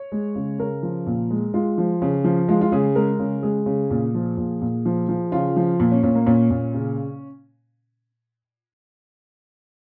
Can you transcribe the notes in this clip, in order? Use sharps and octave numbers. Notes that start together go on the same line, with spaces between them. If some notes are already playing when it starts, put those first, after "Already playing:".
Already playing: C#5
G#3
C#3
C#3 A#4
F3
A#2
G#3
G#3 F4
F3
C#3
F3
G#3 F4
F4
C#3 G#4
G#3 A#4
C#3
G#3 G#4
C#3
A#2
F3
A#2
A#2
F3
F3
C#3 F4
F3
A#2
C#4
A#2 C#4
A#3
A#2 C#4
A#2
C#3